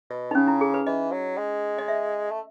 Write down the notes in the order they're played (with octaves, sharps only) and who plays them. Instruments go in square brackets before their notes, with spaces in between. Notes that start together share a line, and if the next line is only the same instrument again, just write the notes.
[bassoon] B2
[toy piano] D#4
[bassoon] C#3 [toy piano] C#4
[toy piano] E4
G#4
B4
[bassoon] E3 [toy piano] D#5
[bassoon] F#3
G#3
[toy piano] D#5
E5
[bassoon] A3